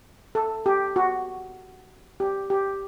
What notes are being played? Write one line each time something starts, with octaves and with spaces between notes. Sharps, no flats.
A4
G4
F#4
G4
G4